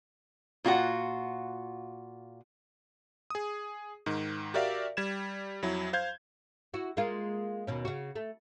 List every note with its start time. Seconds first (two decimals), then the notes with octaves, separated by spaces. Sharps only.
0.64 A#2 F4 F#4 F#5
3.30 G#4 D#6
4.06 G#2 D#3
4.54 F#4 G4 A#4 D5 E5 F5
4.97 G3 G#6 E7
5.62 F2 F#3 E4
5.93 C5 F5 G6 G#6
6.74 E4 F#4
6.97 G#3 A#3 F4
7.67 D#2 B2 C#4
7.85 C#3 F#4
8.16 A3